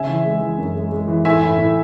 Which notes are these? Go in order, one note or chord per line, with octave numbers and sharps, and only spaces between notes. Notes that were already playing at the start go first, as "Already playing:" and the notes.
Already playing: C#3 C#4 E5 G#5
E3
G#3
E3
F#2
G#3
G#3
E3
A2 E5 G#5
A2
A2